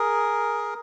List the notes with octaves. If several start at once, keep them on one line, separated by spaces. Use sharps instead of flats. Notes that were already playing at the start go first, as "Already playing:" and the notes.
Already playing: G#4 A#4